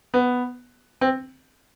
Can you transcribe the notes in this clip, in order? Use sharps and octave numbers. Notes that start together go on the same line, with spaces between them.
B3
C4